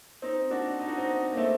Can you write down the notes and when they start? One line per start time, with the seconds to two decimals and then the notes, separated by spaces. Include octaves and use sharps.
0.22 C4 D#4
0.51 D4 F#4
0.80 D#4
0.88 F#4
0.97 C4 D#4
1.32 A#3
1.37 A3 C4